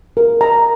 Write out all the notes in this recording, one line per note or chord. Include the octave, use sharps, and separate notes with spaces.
A#4
A#5